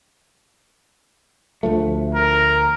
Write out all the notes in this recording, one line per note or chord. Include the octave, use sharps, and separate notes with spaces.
D2 F3 A3
A#4